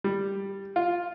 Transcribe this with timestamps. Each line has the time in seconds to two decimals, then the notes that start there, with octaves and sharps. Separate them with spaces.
0.04 G3
0.76 F4